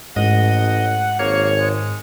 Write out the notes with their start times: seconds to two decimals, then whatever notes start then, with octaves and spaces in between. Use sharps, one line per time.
0.16 A1 G#2 D#5 F#5
1.19 G#1 A#3 C#5
1.60 G#3